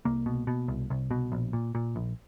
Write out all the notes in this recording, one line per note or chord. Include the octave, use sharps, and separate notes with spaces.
C2 A#3
B2
B2
C2
C2
B2
A#1
A#2
A#2
A#1